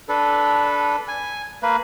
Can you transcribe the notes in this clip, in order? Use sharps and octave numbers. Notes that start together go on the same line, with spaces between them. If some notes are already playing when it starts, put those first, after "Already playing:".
D4 A4 B4
G#5
A#3 B4